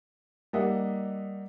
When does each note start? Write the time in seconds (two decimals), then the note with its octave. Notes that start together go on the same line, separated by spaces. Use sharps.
0.53 G3 A#3 D#4 D#5 E5 F#5